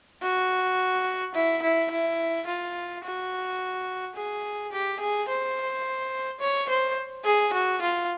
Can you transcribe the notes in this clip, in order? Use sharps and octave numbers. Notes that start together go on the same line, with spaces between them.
F#4
E4
E4
E4
F4
F#4
G#4
G4
G#4
C5
C#5
C5
G#4
F#4
F4